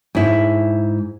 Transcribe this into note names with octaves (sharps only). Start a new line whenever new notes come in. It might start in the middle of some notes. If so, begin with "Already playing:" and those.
G#2 E4